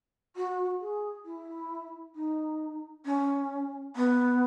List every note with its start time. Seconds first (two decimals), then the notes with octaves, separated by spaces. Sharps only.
0.36 F#4
0.81 G#4
1.25 E4
2.15 D#4
3.05 C#4
3.96 B3